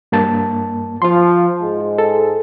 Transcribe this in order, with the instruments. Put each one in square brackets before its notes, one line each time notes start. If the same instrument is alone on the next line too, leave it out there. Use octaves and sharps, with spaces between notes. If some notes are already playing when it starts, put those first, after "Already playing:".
[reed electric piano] G2 A#3 A5
[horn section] F3 [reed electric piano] F4 C6
[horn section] G#2 G#3
[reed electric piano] A4